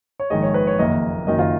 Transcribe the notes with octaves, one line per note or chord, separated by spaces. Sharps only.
C#5
A#1 G#2 D#3 G#3 D#5
C#5
B4
C#5
F#1 F2 D#3 A#3 D#5
F#1 F#2 D#3 D#5
F4